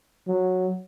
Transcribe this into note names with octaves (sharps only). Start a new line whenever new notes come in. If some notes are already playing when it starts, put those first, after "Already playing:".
F#3